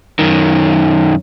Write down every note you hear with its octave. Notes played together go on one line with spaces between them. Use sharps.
F#2 D#3